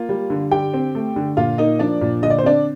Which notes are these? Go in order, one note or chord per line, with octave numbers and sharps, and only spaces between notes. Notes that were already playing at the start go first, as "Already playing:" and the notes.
Already playing: A#3 F4
G3
D3
D3 G4 G5
C4
A3
D3
A#2 F4 F5
A#3 D#4 D#5
F3 D4 D5
A#2
D3 D#5
D5
C5
C4 D4 D5